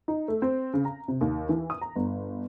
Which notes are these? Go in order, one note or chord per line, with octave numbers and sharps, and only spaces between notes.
D#4
A3
C4
C#3
A#5
C3
D#2
E3
D#6
A#5
G1